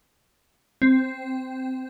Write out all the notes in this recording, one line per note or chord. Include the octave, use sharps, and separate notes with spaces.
C4